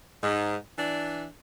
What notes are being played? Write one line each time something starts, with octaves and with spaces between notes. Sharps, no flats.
G#2
E3 D4